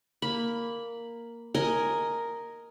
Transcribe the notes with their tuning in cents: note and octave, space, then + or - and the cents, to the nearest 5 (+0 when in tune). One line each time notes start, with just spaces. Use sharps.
A#3 +0 B5 +0
A#4 +0 D#5 +0 G#5 +0